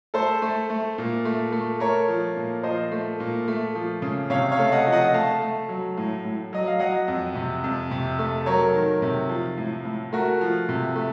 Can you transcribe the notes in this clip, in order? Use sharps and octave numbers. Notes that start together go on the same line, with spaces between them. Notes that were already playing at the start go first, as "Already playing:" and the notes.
A3 A4 C5
A3
A3
A#2
A3
A3
A3 A#4 C#5
F3
A#2
F3 C5 D#5
A3
A#2
A3
F3
C#3
C3 C#5 F5
C#5 F5
A3
D#5 F#5
F3
D#5 F#5
A3 F5 A5
A3
F#3
A2
A2
F#3 D#5
F5
F#3 D#5 F#5
F2
C3
F2
C3
A3
F#3 A#4 C#5
D#3
C3
F3
A2
A2
A3 F#4 A#4
F3
C3
A3